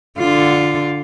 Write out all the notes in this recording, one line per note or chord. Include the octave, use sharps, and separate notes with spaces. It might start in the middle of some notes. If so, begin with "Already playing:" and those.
D3 F4